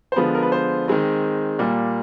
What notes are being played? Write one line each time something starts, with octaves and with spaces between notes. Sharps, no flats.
C5
D3 F3 G#3 B3 B4
A#4
B4
C5
D#3 G#3 C4
A#2 G3 A#3